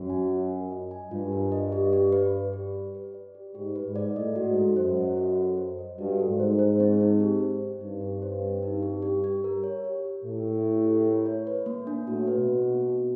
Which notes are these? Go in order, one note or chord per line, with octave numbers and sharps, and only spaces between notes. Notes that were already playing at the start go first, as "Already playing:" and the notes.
Already playing: F#2
G#5
F4
A#4
D#5
G#5
G2 F4
A#4
D#5
G4
G4
B4
D5
G4
G4
B4
D5
G4
G#2 G4
B4
G#2
D5
A2 D#5
F#4
G#2
A4
F#2 C5
D#5
F#4
A4
C5
D#5
G2 F#4
A4
G#2
C5
C5
C4
D#4
G4
C5
C4
G2 D#4
G4
C5
C4
D#4
G4
G4
G4
A#4
C#5
G4
G4
A2 A#4
C#5
G4
G4
A#4
C#5
B4
A#3
D4
A2 F#4
B4
B2
A#3
D4
F#4